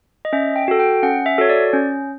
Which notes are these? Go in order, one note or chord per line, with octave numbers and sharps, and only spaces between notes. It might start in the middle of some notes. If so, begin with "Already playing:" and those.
D#5
C#4 E5
G5
F#4 A4
G5
C#4 F#5
E5
F#4 A4 C#5
D5
C#4